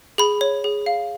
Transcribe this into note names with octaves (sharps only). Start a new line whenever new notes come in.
G#4 B5
C#5
G#4
F5